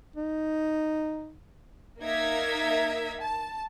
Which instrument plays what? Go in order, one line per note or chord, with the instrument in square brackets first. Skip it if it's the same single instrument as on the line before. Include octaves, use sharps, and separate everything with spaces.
[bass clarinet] D#4
[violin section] A#3 D#4 A#4 E5 G#6 B6
A5